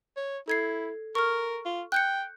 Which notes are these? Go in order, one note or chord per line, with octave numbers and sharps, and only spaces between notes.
C#5
E4 A4 G#6 C7
A#4 C#6 F6
F4
G5 F#6 G6 C#7